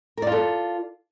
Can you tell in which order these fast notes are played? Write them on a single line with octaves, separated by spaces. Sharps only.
A#4 D5 F4 A4